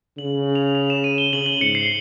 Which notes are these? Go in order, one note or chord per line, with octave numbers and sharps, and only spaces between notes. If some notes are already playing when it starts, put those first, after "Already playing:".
C#3 F#7
F7
F7
E7
D#7
G7
C#3 F#7
F#7
G#2 C#7
C7